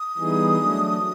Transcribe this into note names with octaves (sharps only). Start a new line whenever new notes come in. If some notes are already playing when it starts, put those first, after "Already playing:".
Already playing: D#6
E3 G3 B3 D#4 G#4
F#3 A3 D4